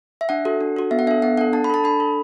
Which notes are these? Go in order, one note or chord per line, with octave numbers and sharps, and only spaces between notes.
E5
D4 F#5
F#4 A4
D4
F#4 A4
B3 E5
F#5
D4 A4 E5
B3 F#5
D4 A4 F#5
D4 A5
B5
A4 A5
D4 B5
A4